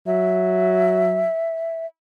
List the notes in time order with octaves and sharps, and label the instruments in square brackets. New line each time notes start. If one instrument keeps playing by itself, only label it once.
[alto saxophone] F#3 [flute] E5